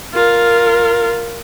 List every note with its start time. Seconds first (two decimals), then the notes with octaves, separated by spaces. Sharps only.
0.14 F4 A#4